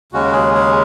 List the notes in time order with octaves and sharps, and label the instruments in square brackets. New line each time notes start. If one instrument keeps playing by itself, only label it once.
[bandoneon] D#2 C#3 G#3 C#4 F#4
G#4
G#4